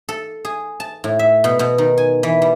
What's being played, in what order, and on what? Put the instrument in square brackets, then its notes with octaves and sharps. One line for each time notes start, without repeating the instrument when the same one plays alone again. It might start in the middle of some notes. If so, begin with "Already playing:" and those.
[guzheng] A4
G#4
A5
A2
E5
B2
B2
D#3
G#5
E3
G3